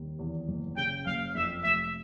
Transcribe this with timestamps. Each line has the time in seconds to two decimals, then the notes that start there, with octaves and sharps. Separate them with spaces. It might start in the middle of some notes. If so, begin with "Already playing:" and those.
Already playing: D#2 G3
0.19 E2
0.48 F#1
0.77 C#3 G5
1.06 F#1 F5
1.35 F2 E5
1.64 F1 E5